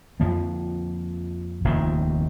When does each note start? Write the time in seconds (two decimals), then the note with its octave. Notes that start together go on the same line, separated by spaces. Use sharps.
0.20 F2 F3 A#3
1.64 F1 D#2 D#3